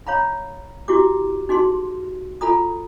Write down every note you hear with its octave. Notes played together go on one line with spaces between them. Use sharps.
C#5 F5 A#5 B5
E4 F#4 G4 D6
D#4 F#4 G#4 C6
F4 A4 A#5 B5 D#6